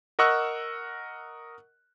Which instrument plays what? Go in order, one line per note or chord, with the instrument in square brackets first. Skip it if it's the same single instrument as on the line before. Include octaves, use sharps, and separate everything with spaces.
[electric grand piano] A#4 D#5 F#5 C#6 E6 F#6